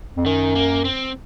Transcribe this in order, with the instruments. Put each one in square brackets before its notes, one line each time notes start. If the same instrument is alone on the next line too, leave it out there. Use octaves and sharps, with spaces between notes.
[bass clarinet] F2
[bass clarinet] F#2 [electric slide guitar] D#3
[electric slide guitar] A#3
C4